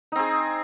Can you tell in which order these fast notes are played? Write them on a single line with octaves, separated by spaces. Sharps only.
D#4 C4 G#4